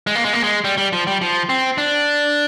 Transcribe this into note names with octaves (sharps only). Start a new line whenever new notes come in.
G#3
A#3
G#3
A#3
G#3
G3
G3
F3
G3
F3
C4
D4